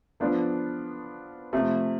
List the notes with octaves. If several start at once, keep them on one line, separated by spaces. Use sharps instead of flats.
F3 B3 D4 F4 A4
C3 F3 A3